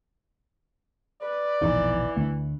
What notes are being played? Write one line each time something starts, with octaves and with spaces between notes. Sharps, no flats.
B4 D5
E1 A#1 E2 E3 D#4
D2 A3 D4